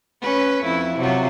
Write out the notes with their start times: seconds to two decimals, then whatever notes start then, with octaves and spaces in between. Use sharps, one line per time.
0.22 C#4 B4
0.64 F2 E4
0.98 C3 F#3 F4